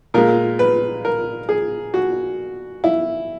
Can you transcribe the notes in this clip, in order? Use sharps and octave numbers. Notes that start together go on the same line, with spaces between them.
A#2 G#3 A#4
B4
A#4
G#4
F#4
E4